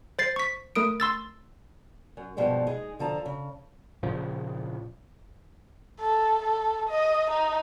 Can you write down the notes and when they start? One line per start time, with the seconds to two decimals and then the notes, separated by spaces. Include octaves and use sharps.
0.19 C5 A6 C7
0.36 C#6 B6
0.75 A3 A#4 D#6 D7
1.00 C6 E6 A6
2.17 F#2
2.37 G2 B2 F3 G3 G#3
2.67 G#3 D#4 G#4
2.99 D3 F3 A5 A#5
3.26 C#3
4.03 A#2 C#3 F3
6.00 A4
6.42 A4
6.89 D#5
7.31 D#4